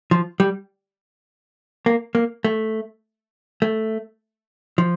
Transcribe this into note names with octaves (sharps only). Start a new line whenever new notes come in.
F3
G3
A#3
A#3
A3
A3
F3